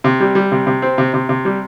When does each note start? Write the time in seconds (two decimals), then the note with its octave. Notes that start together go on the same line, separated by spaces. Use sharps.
0.04 C3
0.20 G3
0.35 G3
0.52 C3
0.67 C3
0.82 C4
0.98 C3
1.14 C3
1.29 C3
1.45 G3